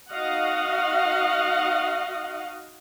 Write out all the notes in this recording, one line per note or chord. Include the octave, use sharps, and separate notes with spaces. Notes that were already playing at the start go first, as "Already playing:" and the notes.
D#4 F#4 D#5 F5 F#5